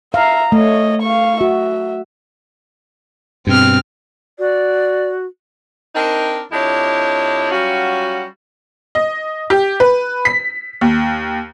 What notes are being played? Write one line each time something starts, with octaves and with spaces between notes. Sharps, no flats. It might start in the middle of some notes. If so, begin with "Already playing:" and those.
E5 F5 A#5
A3 C#5 D#5
F5 C#6
F#4 E5
G2 B2 C4 F6
F#4 D5
C4 D4 D#4 A#4
F2 D4 E4 G4 C#5 D#5
F#3 G3 C#4 F4 F#4
D#5
G4
B4
B6
D#2